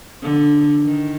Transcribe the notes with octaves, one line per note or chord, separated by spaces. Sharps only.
D3
D#3